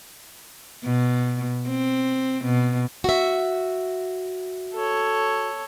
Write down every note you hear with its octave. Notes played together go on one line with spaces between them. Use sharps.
B2
C4
B2
F#4 E5
A4 C#5